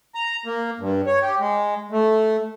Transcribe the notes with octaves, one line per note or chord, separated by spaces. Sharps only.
A#5
A#3
G2
C#5
G4
G#3
A3